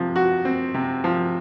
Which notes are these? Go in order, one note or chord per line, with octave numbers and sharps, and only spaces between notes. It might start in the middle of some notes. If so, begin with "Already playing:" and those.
Already playing: C3 F3
F#4
C4
C3
F3